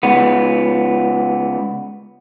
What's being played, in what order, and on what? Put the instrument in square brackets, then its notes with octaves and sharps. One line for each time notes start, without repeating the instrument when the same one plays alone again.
[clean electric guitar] C#2 B3